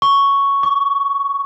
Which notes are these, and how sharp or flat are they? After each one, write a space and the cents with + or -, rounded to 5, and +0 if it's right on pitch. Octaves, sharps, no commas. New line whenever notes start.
C#6 +5
C#6 +35